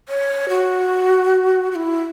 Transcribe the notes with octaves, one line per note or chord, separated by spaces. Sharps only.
C#5
F#4
F#4
E4